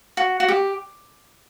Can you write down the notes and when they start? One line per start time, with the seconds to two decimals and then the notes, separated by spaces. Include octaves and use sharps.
0.17 F#4
0.40 F#4
0.48 G4